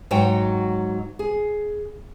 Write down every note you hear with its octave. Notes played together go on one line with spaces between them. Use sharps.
G#2 F#3 F#4 C#5 G5
G#4